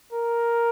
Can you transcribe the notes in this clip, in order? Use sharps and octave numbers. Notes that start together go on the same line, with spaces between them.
A#4